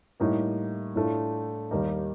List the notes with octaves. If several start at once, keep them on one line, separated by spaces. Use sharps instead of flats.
A2 G3 A#3 D#4
A2 A3 D4 F4
D#2 D#3 G3 A#3 D#4